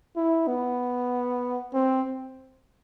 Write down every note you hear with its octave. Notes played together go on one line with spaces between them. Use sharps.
E4
B3
C4